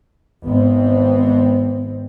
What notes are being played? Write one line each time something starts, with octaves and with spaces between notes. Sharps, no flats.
G#1 B3 C4